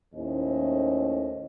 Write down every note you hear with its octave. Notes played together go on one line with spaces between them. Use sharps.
D#2 A2 C#4 E4 C5 D#5